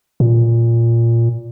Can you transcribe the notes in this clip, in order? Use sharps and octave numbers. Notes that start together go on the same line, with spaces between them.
A#2